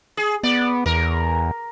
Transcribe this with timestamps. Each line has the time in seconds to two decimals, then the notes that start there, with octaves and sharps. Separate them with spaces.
0.17 G#4
0.43 B3 D5
0.86 E2 A#4